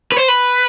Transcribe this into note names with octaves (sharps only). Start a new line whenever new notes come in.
B4
C5
B4